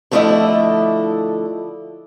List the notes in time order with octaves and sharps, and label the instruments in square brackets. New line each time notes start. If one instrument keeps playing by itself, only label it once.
[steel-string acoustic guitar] D3 F3 A3 E4 D5 D#5